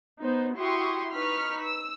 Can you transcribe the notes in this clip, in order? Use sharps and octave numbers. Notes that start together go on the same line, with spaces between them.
B3 D#4 C5
E4 F#4 G4 C6 C#6 D#6
D#4 B4 C#6 F6 B6
E6